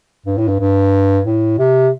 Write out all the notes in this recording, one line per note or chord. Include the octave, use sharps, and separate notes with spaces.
G2
A2
G2
G2
A2
C3